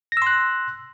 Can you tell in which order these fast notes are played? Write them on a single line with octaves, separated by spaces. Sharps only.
A#6 E6 C6 F#6